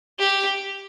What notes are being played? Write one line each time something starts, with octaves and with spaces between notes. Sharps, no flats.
G4